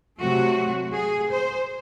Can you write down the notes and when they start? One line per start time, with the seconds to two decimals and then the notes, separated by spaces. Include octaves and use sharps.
0.19 C3 F#3 A3 F#4
0.93 G#4
1.30 C5